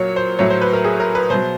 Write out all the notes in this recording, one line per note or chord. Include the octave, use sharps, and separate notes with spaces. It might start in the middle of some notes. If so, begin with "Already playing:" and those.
Already playing: A#2 F#3 C#5
C5
A2 F#3 C#5
C5
B4
A#4
G#4
A#4
B4
B2 F#3 C5